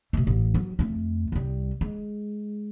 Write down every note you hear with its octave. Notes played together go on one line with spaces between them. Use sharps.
B2 A3
A1
F#3
F2 A3
C2 G3
G#3